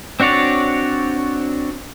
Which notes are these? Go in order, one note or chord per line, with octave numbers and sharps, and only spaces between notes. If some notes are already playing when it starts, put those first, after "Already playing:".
C4 D4 F#4 C#5 D5